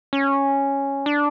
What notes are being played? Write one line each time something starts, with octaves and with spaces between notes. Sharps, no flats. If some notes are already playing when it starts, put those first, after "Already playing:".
C#4
D4